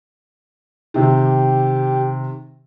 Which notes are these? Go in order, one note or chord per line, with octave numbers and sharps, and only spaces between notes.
C3 D#3 G4